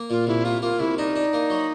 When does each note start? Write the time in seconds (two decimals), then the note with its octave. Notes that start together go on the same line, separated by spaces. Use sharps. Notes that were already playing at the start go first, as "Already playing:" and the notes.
Already playing: A#3
0.10 A#2 F4
0.27 C2 E4
0.44 A#3 F4
0.62 A#3 F4
0.79 C2 E4
0.97 D4 D#4
1.16 D4
1.33 A#3
1.50 F#3